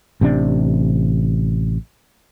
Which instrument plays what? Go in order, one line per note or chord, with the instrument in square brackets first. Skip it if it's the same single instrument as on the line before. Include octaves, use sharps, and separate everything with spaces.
[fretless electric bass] A1 C3 D#3 D4